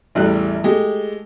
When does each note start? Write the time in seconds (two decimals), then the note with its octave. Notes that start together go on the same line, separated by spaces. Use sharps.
0.15 A1 E2 G3 A3 F#6
0.64 G#3 A3 G4